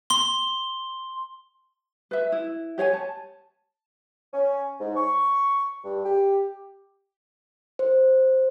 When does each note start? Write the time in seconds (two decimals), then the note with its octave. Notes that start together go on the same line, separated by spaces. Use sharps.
0.10 C6 G7
2.11 B4 E5
2.32 E4
2.78 G4 C#5 F#5 G#5
2.93 A5
4.33 C#4
4.80 G#2
4.96 C#6
5.84 G2
6.04 G4
7.79 C5